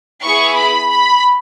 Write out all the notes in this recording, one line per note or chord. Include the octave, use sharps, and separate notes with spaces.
B3 E4 G#4 C#6
B5
B5